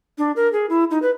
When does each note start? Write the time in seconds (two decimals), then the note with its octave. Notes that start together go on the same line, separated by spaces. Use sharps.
0.18 D4
0.36 A#4
0.53 G#4
0.70 E4
0.91 D#4
1.02 B4